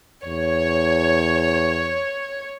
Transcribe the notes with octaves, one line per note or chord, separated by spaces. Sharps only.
E2 C#5